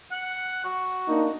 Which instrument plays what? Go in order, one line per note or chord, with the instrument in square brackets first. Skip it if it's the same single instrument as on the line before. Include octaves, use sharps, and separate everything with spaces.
[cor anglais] F#5
F#4
[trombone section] A#3 D4 D#4